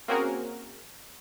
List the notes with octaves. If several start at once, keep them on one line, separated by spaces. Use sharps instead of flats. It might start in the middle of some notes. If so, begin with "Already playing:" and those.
A#3 C4 C#4 F#4 G#4 A#4